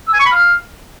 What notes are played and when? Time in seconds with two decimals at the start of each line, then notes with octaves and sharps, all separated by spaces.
0.07 E6
0.13 G#5
0.20 C#6
0.26 B5
0.32 F5